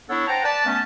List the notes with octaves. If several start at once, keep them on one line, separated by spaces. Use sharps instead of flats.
B3 D4 E4 A4 C#5
C5 F#5 G5 A5 A#5
B4 D5 A5
A3 B3 C#4 A5